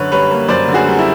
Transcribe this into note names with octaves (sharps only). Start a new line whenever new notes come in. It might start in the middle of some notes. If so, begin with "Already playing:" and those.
Already playing: F#2 D3 B4 C#5
G3 B4 C#5
A#3
F#2 C5 D5
D3
F#4 G#4
G3
E4